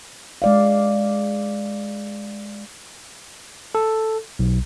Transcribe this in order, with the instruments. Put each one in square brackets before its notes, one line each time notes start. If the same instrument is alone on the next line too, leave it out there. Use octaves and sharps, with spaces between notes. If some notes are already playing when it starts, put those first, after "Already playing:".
[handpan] G#3 D5 F5
[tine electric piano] A4
B1